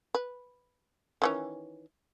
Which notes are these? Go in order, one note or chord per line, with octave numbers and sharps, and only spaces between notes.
B4
D#3 E3 C#4